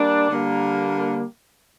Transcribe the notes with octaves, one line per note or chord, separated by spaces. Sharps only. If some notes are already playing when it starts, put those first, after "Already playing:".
Already playing: G3 A#3 D4
D3 G3 A#3